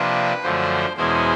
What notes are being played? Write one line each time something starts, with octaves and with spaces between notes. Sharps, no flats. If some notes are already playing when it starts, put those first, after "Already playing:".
Already playing: C3 F3 A#3 D4 F4 B4
F#2 D3 F3 A3 C5
E2 B2 G#3 C#4 E4 C5